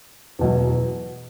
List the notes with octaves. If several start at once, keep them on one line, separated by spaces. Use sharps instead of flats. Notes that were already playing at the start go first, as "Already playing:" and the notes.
E2 B2 F#3